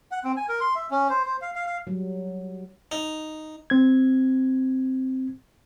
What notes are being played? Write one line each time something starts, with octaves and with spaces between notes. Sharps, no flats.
F#5
C4
G#5
A#4
C6
E5
C#4
C5
C5
F5
F5
F5
F#3 G3
D#4
C4 G#6